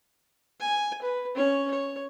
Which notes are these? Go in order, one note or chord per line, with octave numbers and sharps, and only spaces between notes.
G#5
B4
C#4 C#5
C#5